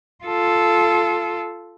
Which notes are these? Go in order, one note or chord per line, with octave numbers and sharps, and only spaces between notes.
F4 A4